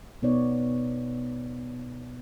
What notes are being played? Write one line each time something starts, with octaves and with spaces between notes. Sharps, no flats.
B2 B3 D#4 C#5 D5